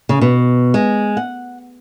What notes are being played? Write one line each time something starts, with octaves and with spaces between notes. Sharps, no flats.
C#3
B2
G#3
F#5